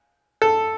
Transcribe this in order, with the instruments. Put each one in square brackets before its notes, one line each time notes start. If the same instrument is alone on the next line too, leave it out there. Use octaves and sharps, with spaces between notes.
[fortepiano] A4